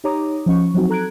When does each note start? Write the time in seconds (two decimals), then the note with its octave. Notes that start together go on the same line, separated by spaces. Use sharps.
0.04 D#4 G4 C#5 A#5 D6 D#6
0.46 F3 C#4 C#6
0.74 F3 F#3 C4 D#4 F#4
0.90 A4 A#5 F#6 G#6 D7